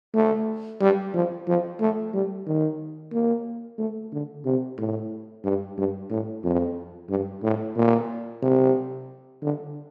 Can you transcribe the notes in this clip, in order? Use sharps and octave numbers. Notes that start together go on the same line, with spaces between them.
A3
G3
F3
F3
A3
G3
D#3
A#3
A3
D3
C3
A2
G2
G2
A2
F2
G2
A2
A#2
C3
D3